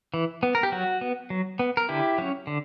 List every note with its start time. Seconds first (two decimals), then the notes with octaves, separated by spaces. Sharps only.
0.14 E3
0.43 B3
0.55 A#4
0.63 G4
0.72 F#3 F#4
1.01 B3
1.30 F#3
1.59 B3
1.77 A#4
1.89 D3 E4 G4
2.18 F#3 C#4
2.47 D3